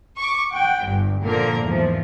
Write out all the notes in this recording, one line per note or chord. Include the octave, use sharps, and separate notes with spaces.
C#6 D6
F#5 G5
G1 G2
A#2 D3 F3 A#3 A#4
E2 G#2 E3 F3